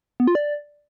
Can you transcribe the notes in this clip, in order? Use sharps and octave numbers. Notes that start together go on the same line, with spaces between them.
B3
F4
D5